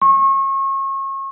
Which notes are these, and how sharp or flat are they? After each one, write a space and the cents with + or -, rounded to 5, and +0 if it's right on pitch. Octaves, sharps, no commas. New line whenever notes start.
C#6 -35